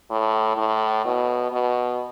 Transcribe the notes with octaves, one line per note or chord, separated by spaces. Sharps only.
A2
A2
B2
B2